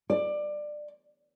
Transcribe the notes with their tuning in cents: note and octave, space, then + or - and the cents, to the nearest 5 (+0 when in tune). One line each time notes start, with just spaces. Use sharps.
D5 +20